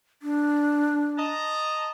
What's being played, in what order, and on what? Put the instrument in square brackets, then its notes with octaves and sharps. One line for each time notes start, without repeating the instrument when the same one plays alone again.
[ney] D4
[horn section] D#5 A5 A#5